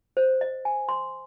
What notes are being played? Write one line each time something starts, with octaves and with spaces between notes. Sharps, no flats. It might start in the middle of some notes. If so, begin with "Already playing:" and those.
C5
D#5
G#5
C6